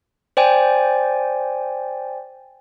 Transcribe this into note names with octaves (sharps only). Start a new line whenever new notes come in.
C5 D5 G5 G#5